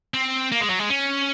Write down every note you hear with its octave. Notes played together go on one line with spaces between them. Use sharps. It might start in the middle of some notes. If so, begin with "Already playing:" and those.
C4
A#3
G#3
F#3
G#3
C#4